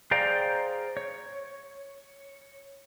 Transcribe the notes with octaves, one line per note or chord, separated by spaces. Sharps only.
G#4 C5 D5 F5 G5 A#5
C#5